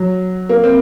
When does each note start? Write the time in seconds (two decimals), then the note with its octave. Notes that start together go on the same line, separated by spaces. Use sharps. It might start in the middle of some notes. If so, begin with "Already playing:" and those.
Already playing: F#3
0.49 A#3
0.64 C4